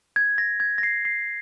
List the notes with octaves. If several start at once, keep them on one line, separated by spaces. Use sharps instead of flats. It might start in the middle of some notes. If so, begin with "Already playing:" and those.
G#6
A#6
G#6
A#6
C7
C7